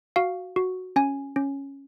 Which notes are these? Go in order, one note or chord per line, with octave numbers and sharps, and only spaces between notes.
F#4 F5
F#4
C#4 G#5
C#4